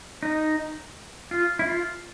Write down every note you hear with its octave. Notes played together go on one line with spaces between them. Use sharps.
D#4
F4
E4
F4